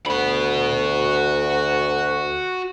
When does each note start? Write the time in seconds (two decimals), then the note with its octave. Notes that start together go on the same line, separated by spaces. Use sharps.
0.06 D2 F#4 B5